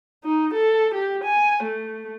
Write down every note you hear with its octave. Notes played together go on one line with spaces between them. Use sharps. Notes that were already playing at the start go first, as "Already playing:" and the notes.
D#4
A4
G4
G#5
A3